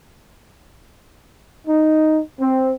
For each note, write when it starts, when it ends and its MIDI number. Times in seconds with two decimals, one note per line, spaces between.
1.67 2.20 63
2.41 2.72 60